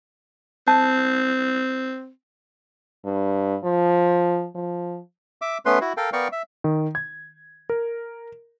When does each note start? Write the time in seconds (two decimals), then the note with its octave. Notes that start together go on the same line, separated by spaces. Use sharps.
0.68 C4 A5
3.05 G2
3.64 F3
4.55 F3
5.42 E5 D6
5.66 A3 B3 C#4 B4 C6
5.81 E4 F#4
5.97 A4 A#4 F5 G5
6.13 B3 A#4 D5 F5 G5 C#6
6.32 E5
6.64 D#3
6.95 G#6
7.69 A#4